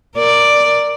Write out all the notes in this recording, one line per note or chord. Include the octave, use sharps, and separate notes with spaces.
A#4 D5